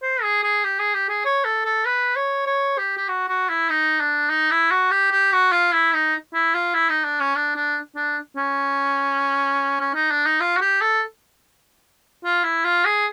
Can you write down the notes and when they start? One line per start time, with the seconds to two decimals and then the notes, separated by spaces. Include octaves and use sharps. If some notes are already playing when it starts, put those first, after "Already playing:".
0.03 C5
0.22 G#4
0.43 G#4
0.64 G4
0.79 G#4
0.94 G4
1.09 G#4
1.25 C#5
1.45 A4
1.65 A4
1.85 B4
2.16 C#5
2.46 C#5
2.78 G4
2.97 G4
3.08 F#4
3.29 F#4
3.49 E4
3.70 D#4
4.00 D4
4.30 D#4
4.51 E4
4.71 F#4
4.91 G4
5.12 G4
5.32 F#4
5.52 F4
5.73 E4
5.94 D#4
6.34 E4
6.55 F4
6.75 E4
6.89 D#4
7.04 D4
7.20 C#4
7.36 D4
7.56 D4
7.96 D4
8.37 C#4
9.80 C#4
9.95 D#4
10.10 D4
10.26 D#4
10.40 F4
10.57 F#4
10.61 G4
10.81 A4
12.25 F4
12.44 E4
12.65 F4
12.85 G#4